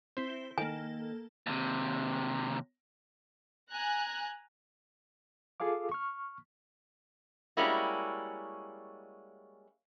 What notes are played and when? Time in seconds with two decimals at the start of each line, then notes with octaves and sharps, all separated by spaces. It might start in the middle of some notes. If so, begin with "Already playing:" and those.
0.17 C4 E4 C5 G7
0.58 D#3 A#3 A4 G#5
1.47 D#2 C3
3.71 G#5 A#5 F#6
5.60 F4 G#4 A4 F5 D6
5.92 C#6 F6
7.57 G3 G#3 A#3 C#4 E4 F#4